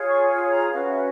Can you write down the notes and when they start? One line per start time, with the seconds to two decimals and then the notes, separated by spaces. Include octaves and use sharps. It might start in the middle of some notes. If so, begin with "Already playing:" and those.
Already playing: F4 G#4 C#5
0.08 C#6
0.48 A#5
0.72 C#4 F#4 B4 F5
0.89 E5